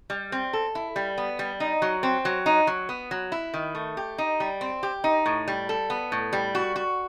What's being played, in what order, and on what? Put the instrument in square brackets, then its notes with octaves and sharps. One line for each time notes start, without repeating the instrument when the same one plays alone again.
[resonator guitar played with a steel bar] G3
C4
A4
E4
G3
B3
G3
D#4
F#3
C4
F#3
D#4
F#3
B3
F#3
E4
D#3
A3
G4
D#4
G3
C4
G4
D#4
A2
G3
A4
B3
A2
G3
F#4
F#4